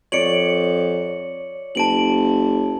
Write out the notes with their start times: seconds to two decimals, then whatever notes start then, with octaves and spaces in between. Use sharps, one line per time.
0.12 F2 C#5 D5 C#7 D7 F#7
1.75 F#1 A5 D7 F#7